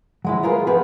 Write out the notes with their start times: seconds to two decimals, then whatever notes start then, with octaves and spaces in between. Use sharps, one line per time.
0.25 F#3 G#3 E4
0.43 F4 G#4 A#4 B4
0.67 F3 B3 G4 G#4 B4